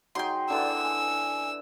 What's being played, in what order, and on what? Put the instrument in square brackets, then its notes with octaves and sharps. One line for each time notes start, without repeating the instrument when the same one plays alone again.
[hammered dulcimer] F#3 D#4 G#4 [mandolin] G5 C6
[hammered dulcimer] D3 E3 B4 [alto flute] D5 [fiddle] E6
[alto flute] G#5